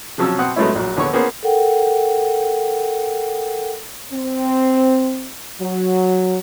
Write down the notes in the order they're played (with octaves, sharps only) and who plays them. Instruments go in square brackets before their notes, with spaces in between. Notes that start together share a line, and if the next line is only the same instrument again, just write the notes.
[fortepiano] C3 F3 F#3 C#4 A5 E6
B2 C4 F#5 D#6
F#3 G#3 A3 B3 C#4 E4
A#1 F#3
D#2 D3 B3 C#5 C#6
A#3 B3 C#4 G#4 C5 F#5
[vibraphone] A4 A#4 F#5 G5
[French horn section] C4
F#3